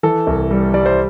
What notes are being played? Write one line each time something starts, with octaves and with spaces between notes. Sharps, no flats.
E3 A4
C2
G3
G3 D5
C5